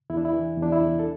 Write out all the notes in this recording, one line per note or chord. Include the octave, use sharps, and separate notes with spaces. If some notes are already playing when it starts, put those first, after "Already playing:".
E2 E4
D4
E4
E3
E2
D4
E4
E2
A4